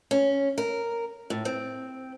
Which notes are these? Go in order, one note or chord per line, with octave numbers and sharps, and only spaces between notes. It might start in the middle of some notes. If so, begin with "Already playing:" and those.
C#4
A#4
A2
C4